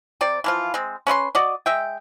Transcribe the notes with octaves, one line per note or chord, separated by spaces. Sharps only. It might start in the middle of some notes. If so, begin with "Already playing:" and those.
C3 C4 D5
E3 F3 F4
G#3 C4
C#4 B4 D#5 C6
F#4 D5 D#5
G#3 E5 G5